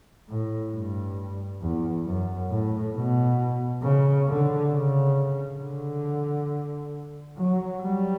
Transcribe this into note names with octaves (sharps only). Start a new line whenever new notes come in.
A2
G2
E2
F#2
A2
B2
C#3
D3
C#3
D3
F#3
G3